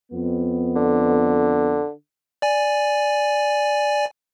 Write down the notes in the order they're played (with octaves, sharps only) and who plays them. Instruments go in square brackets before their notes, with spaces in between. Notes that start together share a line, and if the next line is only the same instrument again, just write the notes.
[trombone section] F2 B3
[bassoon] D3
[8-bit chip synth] D5 G#5